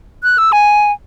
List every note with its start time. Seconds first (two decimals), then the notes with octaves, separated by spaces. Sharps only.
0.23 F#6
0.38 E6
0.52 G#5